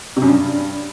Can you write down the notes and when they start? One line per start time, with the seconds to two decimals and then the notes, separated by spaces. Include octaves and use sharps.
0.16 C3
0.22 F#2
0.27 G2